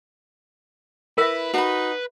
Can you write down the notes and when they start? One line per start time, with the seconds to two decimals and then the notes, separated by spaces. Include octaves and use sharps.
1.18 E4 A#4 B4 E5
1.54 D#4 F#4 B5